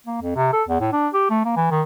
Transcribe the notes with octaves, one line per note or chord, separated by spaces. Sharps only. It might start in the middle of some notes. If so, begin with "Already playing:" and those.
A#3
F2
C3
A4
E2
A2
D4
G4
A3
A#3
E3
D#3